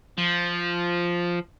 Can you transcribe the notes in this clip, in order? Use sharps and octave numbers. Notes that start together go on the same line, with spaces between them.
F3